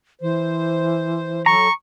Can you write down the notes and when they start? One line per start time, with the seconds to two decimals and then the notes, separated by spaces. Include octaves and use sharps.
0.21 E3 C5
1.46 F#3 A4 A#5 C#6